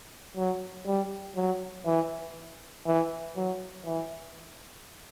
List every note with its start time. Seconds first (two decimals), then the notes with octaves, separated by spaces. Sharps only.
0.36 F#3
0.86 G3
1.36 F#3
1.86 E3
2.86 E3
3.36 F#3
3.86 E3